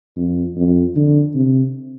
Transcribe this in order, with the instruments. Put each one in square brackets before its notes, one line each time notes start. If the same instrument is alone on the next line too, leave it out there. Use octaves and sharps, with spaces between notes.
[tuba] F2
F2
D3
C3